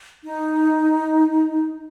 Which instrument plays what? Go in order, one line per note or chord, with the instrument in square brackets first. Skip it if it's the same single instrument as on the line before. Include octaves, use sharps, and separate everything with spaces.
[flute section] D#4